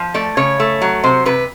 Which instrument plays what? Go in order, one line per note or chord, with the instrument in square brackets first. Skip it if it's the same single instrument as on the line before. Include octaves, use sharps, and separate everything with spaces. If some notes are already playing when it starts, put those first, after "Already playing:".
Already playing: [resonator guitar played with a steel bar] F3
A3 D5
C#3 C#5
A3
F#3
C3 C5
C3 B4